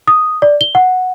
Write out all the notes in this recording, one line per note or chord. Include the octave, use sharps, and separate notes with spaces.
D#6
D5
G7
F#5